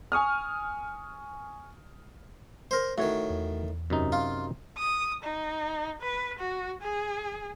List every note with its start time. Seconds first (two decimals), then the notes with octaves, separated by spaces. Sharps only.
0.12 G#5 C#6 D#6 F6
2.71 A#4 C5
2.98 A2 D#3 F#4 C#5
3.30 E2
3.90 F#2 C3 D#4
4.12 F4
4.78 D#6
5.23 D#4
6.02 B4
6.39 F#4
6.82 G#4